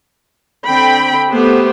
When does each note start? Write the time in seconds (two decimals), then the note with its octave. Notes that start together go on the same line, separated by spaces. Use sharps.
0.66 D3 C4 G5 B5
1.30 A3 B3 G4 C5